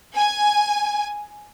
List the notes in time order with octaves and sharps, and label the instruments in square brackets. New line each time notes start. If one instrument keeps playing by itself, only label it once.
[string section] G#5